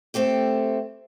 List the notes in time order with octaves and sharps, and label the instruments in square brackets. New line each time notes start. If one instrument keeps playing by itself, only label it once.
[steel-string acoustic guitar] A3 C4 G4 A4